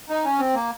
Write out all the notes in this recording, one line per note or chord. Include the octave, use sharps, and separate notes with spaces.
D#4
C#4
C4
A#3